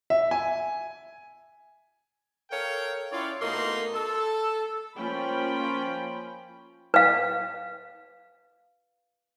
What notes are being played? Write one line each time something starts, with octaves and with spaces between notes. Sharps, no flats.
E5
G#5
A4 A#4 C#5 F5 G5
C#4 E4 F4 C#5 D5
B2 A3 A#3 D#4 C6
A4
F3 A#3 C#4 F4 G5 B5
B4 F5